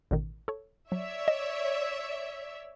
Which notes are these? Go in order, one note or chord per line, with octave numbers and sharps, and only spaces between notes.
A1 B2 D#3
A4 C#5
F#3 C#5 D5 E5
D#5